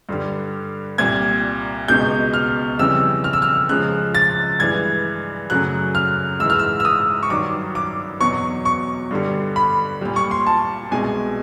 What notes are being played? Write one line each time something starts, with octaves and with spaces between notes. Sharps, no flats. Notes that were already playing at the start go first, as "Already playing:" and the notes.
G2 D3 G3
C2 A#2 G3 G#6
C#2 B2 G#3 G6
F6
F2 C#3 E3 G3 E6
F6
E6
F6
C#2 C#3 F3 G#3 F#6
A6
G2 E3 G#3 G#6
F#2 C#3 F#3 A3 F#6
F6
G#2 E3 G#3 E6
F6
E6
E6
D#6
C#6
G2 D#3 F#3 D6
D6
E2 B2 F#3 C#6
C#6
G2 D3 G3
B5
A#2 G3
C#6
C6
A5
C2 B2 G#3 G#5